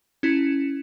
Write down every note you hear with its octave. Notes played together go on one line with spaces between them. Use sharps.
C#4 E4